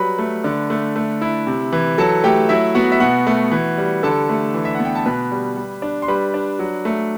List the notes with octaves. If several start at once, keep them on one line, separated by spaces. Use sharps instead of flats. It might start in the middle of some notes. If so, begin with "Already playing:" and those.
Already playing: F#3 G3 B4 B5
A3
D3
A3
A3
E4
C3
E3
F#3 A4 A5
A3 G4 G5
F#3 E4 E5
B3 F#4 F#5
E5
B2 F#4 F#5
A3
E3
G3
D3 A4 A5
A3
E3
E5
B3 F#5
G5
A5
B2 B4 B5
G3
G3
D4
C6
G3 B4 B5
D4
F#3
A3